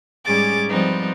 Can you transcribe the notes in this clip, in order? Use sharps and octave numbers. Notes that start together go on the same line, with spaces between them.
G#2 G3 C#4 G#4 D6 A6
F3 G3 B3 C4 D#4